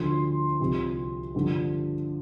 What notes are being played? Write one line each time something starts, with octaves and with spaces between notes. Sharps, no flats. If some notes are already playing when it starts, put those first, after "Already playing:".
Already playing: D2 D3 F3 C6
C2 C3 F3
G2 D3 F3